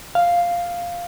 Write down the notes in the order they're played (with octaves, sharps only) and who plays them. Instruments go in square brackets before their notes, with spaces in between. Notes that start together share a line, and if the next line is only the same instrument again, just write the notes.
[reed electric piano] F5